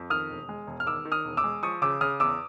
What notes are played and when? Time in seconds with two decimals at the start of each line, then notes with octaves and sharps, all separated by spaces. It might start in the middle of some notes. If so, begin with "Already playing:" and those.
Already playing: F2
0.10 D#3 D#6 F6
0.30 E1
0.49 G#3
0.67 E1
0.80 F6
0.86 D#3 D6 E6
1.05 D#3
1.12 D#6 F6
1.25 E1
1.37 D6 E6
1.44 G#3
1.63 F3 C#6 D#6
1.82 C#3 D6 E6
2.01 C#3 D#6 F6
2.20 E2 D6 E6